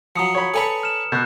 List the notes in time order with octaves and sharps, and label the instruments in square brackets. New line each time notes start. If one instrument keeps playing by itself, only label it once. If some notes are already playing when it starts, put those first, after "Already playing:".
[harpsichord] F3 F#3 [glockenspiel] A#5 D#6 C#7
[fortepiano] C#5 B5
[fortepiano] A4 G#5 B5 [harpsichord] B4 C#5 D5
[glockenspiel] F6 E7
[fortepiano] B2 [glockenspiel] F#6 G6